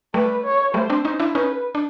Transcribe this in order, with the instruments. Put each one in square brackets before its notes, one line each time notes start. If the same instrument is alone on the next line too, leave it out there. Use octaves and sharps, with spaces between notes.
[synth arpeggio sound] G3 A3 [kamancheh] B4
[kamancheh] C#5
[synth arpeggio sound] G3 A3 [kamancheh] C5
[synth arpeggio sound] C4 D4
C#4 D#4
D4 E4
[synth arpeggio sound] C#4 D#4 [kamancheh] B4
[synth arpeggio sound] D4